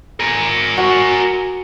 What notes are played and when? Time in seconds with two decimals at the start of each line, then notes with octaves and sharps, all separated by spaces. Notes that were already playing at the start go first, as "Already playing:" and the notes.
0.20 A#4 G#5
0.77 F#4